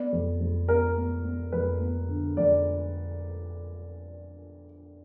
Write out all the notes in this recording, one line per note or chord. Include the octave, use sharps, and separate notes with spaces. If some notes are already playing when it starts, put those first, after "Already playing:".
Already playing: B3 D5
F2
F2
B3 A#4
B3
B3
F2 B4
B3
D3
F2 D5